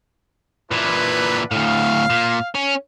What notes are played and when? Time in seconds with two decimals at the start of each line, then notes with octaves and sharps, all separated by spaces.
0.71 A#2 E3 D4 E4 B4
1.51 D2 A2 F5
2.10 A#2
2.54 C#4